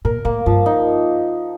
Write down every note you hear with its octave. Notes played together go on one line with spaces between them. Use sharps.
A#2 A#4
A2 A#3
G2 F3
D#4